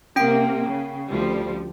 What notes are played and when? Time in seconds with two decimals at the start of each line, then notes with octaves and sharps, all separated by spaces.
0.16 C3 A#3 C#4 G5 D7
0.67 C#3
1.09 D2 F3 G3